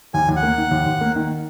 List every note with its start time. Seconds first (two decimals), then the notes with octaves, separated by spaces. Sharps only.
0.14 D#2 G#5
0.28 D#2
0.36 F#5
0.43 A#3
0.58 D#3
0.71 D#2
0.86 D#2
1.01 A#3
1.16 D#3